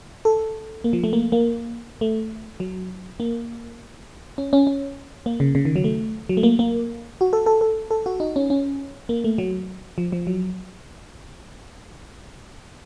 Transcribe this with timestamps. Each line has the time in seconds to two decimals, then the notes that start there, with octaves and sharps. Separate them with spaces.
0.25 A4
0.84 A#3
0.93 F3
1.04 A3
1.13 A#3
1.32 A#3
2.01 A3
2.60 F#3
3.20 A#3
4.38 C#4
4.53 C#4
4.67 C#4
5.26 A#3
5.40 C#3
5.55 C#3
5.65 D#3
5.76 F#3
5.84 A3
6.29 F#3
6.37 A3
6.43 A#3
6.59 A#3
7.21 F#4
7.33 A4
7.46 A4
7.61 A4
7.91 A4
8.06 F#4
8.20 D#4
8.36 C#4
8.50 C#4
9.09 A#3
9.24 A3
9.38 F#3
9.98 F3
10.12 F3
10.27 F#3